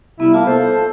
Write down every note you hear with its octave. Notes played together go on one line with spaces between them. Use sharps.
C3 G3 B3 E4
A#3 F4 A5
A4 C5